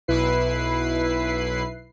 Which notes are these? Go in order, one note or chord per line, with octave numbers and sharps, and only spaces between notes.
B1 E4 B4 C7